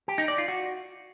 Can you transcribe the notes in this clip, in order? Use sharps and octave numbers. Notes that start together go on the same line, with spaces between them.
G4
D#4
D5
F4
F#4